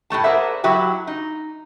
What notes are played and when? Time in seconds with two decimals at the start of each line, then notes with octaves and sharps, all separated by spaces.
0.10 A2 G3 A3 A5
0.24 G#4 A#4 C5 D5 E5 F#5
0.64 F#3 E4 F#4 G4
1.07 D#4